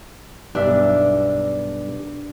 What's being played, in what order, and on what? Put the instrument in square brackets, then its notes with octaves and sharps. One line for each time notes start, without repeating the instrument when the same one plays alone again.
[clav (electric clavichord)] B1 G2 E5 [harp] D4